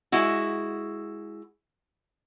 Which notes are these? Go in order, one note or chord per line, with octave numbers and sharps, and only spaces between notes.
G#3 E4 F#4